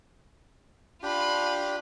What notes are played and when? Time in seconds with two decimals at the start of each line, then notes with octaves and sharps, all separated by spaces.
1.03 D4 F4 G4 B5